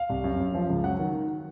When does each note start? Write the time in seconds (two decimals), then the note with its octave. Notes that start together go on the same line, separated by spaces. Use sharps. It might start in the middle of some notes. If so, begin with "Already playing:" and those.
Already playing: F5
0.09 C2
0.24 F#2
0.40 F#2
0.55 F3
0.69 C#2
0.84 F#3 F#5
0.99 D#3